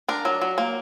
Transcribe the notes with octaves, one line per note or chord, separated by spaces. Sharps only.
D4 A#4
F#3
F#3
A#3